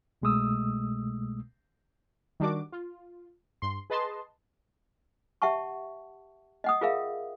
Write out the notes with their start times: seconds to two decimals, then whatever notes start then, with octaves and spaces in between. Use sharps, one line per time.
0.22 C2 B2 G#3 A3 D#6 E6
2.40 D#3 G3 D4 F#4 D6
2.72 F4
3.62 G2 C6
3.90 G#4 B4 D#5 A5 C6
5.42 G4 E5 F#5 A5 C#6
6.64 D#5 F#5 D#6
6.81 F4 G#4 A#4 E5 F5